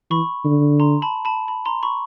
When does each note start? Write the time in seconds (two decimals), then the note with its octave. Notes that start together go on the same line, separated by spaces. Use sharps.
0.10 E3 B5 C#6
0.45 D3
0.80 A#5 C6
1.02 A5 B5
1.25 A5 B5
1.48 A5 B5
1.65 A#5 C6
1.83 B5 C#6